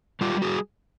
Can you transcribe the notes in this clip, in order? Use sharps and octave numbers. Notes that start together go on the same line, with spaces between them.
G3 F4 G4
G3
F#4 G#4